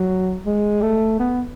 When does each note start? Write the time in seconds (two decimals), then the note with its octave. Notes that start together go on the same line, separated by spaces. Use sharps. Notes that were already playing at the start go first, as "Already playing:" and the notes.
Already playing: F#3
0.46 G#3
0.82 A3
1.19 B3